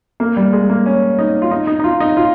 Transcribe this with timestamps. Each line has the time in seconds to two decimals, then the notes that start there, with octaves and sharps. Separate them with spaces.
0.20 A#3
0.37 G3
0.53 G#3
0.70 A#3
0.86 C#4
1.19 D#4
1.42 F4
1.51 D#4
1.67 D#4
1.80 D#4
1.84 F4
2.00 D#4
2.17 F4